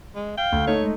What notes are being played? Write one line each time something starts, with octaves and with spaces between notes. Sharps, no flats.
G#3
F5 G5
D2
A3 D#4 C#5
G#3